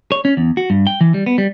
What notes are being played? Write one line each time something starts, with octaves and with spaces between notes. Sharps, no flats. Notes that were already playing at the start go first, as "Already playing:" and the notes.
C#5
C#4
E2
F#4
G2
G5
E3
G3
B3
G3